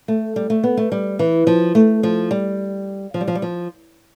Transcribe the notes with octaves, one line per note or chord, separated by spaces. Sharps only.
A3
G3
A3
B3
A3
G3
E3
F3
A3
F3
G3
F3
G3
F3
G3
F3